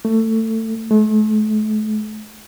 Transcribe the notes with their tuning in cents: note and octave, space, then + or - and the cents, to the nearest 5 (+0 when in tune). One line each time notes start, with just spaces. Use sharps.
A3 +20
A3 -40